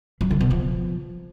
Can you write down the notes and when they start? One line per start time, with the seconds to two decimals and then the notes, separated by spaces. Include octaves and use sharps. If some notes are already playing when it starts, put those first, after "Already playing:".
0.21 F#3
0.31 D3
0.41 B2
0.51 F3